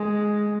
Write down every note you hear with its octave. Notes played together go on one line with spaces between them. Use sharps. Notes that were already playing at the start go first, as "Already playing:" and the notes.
Already playing: G#3